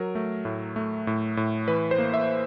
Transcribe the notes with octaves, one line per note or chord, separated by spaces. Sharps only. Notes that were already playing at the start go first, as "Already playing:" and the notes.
Already playing: F#3 A#4
A3
A2
A3
A2
A2
E3 B4
C5
A#3
E5